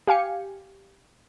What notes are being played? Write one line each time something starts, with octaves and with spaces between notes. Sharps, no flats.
G4 F5 G#5 C#7